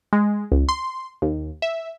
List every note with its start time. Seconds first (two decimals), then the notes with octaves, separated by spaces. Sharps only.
0.13 G#3
0.52 C#2
0.69 C6
1.22 D#2
1.62 E5